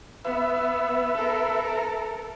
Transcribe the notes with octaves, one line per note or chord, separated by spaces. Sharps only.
B3 B4 E5
A4 A#4